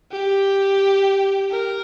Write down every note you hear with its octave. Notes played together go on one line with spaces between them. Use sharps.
G4
A#4